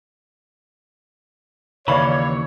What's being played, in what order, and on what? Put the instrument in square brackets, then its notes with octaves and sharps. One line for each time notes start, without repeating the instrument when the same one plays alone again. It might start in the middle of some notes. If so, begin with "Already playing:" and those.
[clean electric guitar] D#2 E3 [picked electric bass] C#3 [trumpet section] C#5 [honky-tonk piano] D5 F5 B5